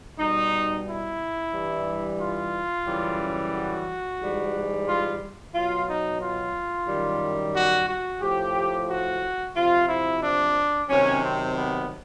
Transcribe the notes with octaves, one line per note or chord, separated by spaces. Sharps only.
B2 G3 D#4
E4
G2 E3 G3
F4
F#2 C#3 E3 G3
F#4
G#2 E3 G3
F4
B2 F#3 F4
D#4
F4
F#2 D#3 G3
F#4
F#4
A2 F3 G4
F#4
C3 F3 F4
E4
D4
C3 D#3 F#3 C#4
C4
B3